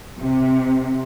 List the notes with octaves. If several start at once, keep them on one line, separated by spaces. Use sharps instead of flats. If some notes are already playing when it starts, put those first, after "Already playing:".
C3